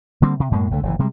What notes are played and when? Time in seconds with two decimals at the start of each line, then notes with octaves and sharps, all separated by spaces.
0.22 D3 G3 A#3 C4
0.40 C3
0.51 F#2 A2 G#3 A#3
0.71 C#2 D3 A3
0.83 F#1 C3 E3
0.99 C3 G3 G#3